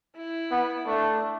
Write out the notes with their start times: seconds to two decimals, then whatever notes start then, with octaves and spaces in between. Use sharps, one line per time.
0.17 E4
0.52 B3
0.87 A3 D4